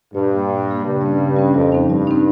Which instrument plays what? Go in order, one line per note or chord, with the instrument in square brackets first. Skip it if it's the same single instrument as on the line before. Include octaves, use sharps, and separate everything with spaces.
[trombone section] G2 [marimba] A#2
[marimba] G3 A#3
A#2
G3 A#3
[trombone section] G2 [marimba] C#3
[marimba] G3 C#4
C#3
G3 C#4
[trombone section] F2 [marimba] G3
[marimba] C4 D#4
[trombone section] G2 [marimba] G3
[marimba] C4 D#4